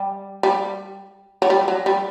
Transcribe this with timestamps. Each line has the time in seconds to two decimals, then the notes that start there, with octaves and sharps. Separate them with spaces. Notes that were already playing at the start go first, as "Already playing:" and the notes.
Already playing: G3
0.43 G3
1.42 F#3
1.50 G3
1.68 F#3
1.86 G3